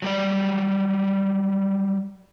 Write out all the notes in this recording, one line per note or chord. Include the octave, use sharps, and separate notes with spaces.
F#3 G3 D5